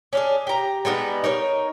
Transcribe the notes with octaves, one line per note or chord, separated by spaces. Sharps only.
C#4 D4 G#4
G4 A#5
G3 G#3 B3 D#4
D#4 A#4 C#5